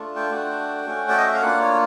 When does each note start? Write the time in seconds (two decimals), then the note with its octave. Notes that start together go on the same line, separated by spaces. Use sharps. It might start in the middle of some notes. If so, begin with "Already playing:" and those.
Already playing: A3 D4 F4
0.16 G5
0.30 A3 D4 F#4
0.86 A3 C#4 F#4
1.09 D5
1.17 D#5
1.26 E5
1.34 F5
1.42 A#3 D4 F4 F#5
1.61 C#5